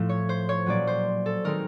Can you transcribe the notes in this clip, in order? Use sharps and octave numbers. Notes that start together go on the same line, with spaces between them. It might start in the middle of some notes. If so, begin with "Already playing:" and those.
Already playing: A2 F3 A3
C#5
C5
C#5
A#2 F#3 A#3 C#4 D5
C5
A4
D#3 G#3 C4 D#4 A#4